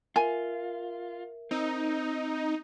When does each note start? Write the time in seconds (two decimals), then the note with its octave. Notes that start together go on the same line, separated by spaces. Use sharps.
0.16 F4 A#4 E5 G#5
1.51 C4 D#4